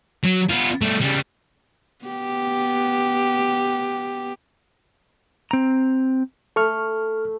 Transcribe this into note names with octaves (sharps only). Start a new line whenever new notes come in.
F#3
B3 F4
G3 A3
C#3 G3
B3 G4
C4 A#5
A3 A4 C#6 F6